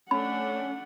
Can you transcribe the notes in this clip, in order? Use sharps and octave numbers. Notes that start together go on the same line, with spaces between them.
A3 C#4 D4 F#5 B5